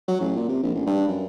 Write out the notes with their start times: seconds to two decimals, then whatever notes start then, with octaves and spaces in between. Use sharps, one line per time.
0.08 F#3
0.21 A1
0.36 A#2
0.49 C3
0.63 A#1
0.75 A1
0.87 G2
1.08 F#2